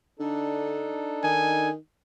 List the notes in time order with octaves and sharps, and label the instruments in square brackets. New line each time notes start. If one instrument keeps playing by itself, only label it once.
[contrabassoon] D3 [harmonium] D4 D#4 A4
[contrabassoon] D#3 [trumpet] G#5